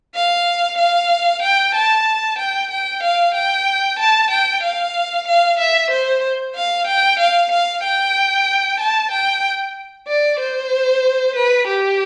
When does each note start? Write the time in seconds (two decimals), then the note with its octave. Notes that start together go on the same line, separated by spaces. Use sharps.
0.15 F5
0.79 F5
1.43 G5
1.75 A5
2.39 G5
2.71 G5
3.04 F5
3.35 G5
3.99 A5
4.31 G5
4.63 F5
5.28 F5
5.59 E5
5.91 C5
6.56 F5
6.87 G5
7.20 F5
7.52 F5
7.83 G5
8.80 A5
9.11 G5
10.08 D5
10.40 C5
11.36 B4
11.68 G4